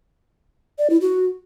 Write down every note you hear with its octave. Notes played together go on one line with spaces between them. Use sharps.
D5
E4
F#4